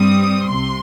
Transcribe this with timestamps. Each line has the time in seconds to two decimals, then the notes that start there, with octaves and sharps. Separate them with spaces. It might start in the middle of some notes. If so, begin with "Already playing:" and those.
Already playing: G2 G3 C4 D#6
0.48 C2 C3 C6